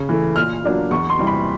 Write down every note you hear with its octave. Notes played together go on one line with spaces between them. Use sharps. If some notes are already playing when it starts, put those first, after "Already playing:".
Already playing: C#3
E3 A3
A#2 F6
F#3 A#3 D4 F4
E2 C#6
C6
C3 E3 G3
B5